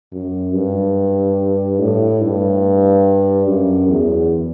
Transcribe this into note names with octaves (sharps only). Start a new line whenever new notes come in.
F#2
G2
A2
G2
F#2
E2